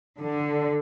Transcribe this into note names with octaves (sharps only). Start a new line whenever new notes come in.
D3